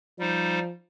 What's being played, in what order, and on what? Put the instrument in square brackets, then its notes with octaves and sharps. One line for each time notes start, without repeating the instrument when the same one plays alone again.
[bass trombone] F3 [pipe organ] G3 D#4 C5